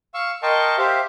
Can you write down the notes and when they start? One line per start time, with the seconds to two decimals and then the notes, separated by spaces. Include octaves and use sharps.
0.14 F5 C#6 E6
0.43 A#4 D#5 G5 A5 C6 C#6
0.78 G4 C5 E5 F5